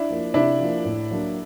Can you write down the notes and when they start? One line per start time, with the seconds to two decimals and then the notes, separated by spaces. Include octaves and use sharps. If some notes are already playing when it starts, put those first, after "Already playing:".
Already playing: D4 E4
0.09 F3 A#3
0.34 C3 D4 E4
0.59 F3 A#3
0.85 A2
1.11 F#3 A#3 D4